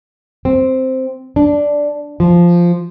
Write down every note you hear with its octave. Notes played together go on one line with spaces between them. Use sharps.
C4
D4
F3